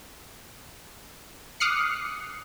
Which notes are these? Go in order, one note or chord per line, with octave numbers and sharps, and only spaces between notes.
D6 D#6 F6 F#6 C7 C#7